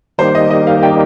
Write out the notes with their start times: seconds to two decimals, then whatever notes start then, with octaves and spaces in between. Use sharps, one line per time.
0.18 D#3 G3 A#3 D#4 G4 C5
0.35 D#5
0.50 D#5
0.67 F5
0.83 G5